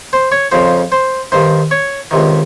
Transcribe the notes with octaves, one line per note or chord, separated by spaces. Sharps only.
C5
C#5
F2 C#3 C5
C5
G2 D#3 C5
C#5
C#2 C3 D#3